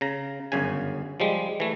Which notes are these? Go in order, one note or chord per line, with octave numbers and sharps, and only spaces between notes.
C#3 A#5
G1 F#2 C#3 G#5
F3 G3 G#3
E3 A3